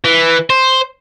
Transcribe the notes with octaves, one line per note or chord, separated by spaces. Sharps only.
E3
C5